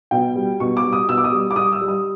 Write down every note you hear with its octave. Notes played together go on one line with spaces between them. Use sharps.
B2 G5
G3
B2 C#6
D6
G3
D#6
B2 E6
D6
D#6
G3
D6
G3 D#6
E6
G3
D#6